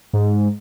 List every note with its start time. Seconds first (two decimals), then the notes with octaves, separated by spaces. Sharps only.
0.13 G#2